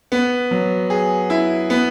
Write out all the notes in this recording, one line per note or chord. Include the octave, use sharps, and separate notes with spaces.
B3
F#3
G#4
E4
B3